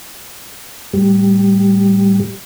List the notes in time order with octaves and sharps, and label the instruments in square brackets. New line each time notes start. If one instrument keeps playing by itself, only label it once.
[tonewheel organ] A2 G3 G4